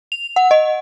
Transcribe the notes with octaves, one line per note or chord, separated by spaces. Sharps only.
F7
F#5
D#5